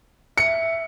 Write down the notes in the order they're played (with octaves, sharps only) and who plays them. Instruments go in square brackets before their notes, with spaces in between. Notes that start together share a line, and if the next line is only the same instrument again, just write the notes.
[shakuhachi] E5 [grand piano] C#7